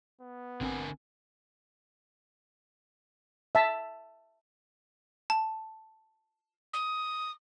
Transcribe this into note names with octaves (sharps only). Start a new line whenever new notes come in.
B3
A1 D3 C4 A#4 G#5 E6
E5 A5
A5
D#6